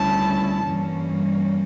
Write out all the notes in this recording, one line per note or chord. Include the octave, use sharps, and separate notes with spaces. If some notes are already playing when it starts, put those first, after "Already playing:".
Already playing: D2 C#3 G3 C#4 E4 A5
G2 E3 G3 A#3 C#4